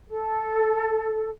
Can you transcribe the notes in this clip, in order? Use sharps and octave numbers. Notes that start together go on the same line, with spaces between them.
A4